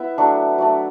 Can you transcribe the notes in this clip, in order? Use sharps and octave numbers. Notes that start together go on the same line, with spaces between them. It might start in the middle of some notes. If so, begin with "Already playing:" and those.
Already playing: B3 E4 B4 E5
F#3 A3 D4
F#3 A3 D4